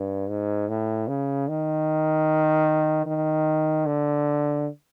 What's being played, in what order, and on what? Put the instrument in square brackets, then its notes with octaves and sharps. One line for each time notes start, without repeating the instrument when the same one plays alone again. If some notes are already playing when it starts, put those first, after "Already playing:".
Already playing: [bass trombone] G2
G#2
A2
C#3
D#3
D#3
D3